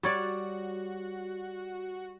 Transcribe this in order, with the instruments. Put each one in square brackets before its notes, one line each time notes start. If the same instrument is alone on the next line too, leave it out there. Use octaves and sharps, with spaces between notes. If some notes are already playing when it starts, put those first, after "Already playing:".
[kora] G3 C#5 D5 [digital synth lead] F#4